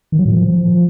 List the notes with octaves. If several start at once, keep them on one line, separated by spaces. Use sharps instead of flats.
D#3
F#3
A2
F3